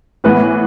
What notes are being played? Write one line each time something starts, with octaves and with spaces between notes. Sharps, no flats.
A2 E3 B3 B4